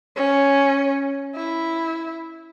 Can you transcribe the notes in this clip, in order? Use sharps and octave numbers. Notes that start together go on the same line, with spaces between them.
C#4
E4